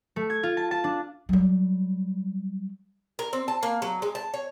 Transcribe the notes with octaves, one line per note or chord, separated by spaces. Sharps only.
A3
G#6
F4
A5
A5
D4
F#3 G3
A#4
C4
A5
A#3
F#3
G#3
A5
C#5